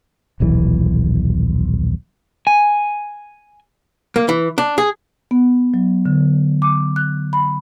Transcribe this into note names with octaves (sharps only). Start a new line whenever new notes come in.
D#1 B1 E3
G#5
A#3
E3
D4
G#4
B3
F#3
D3
D6
F#6
B5